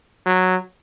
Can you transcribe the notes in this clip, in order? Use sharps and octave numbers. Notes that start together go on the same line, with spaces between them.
F#3